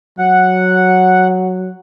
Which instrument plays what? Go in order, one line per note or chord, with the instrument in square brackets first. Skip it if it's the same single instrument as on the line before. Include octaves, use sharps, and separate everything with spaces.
[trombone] F#3 [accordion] F#5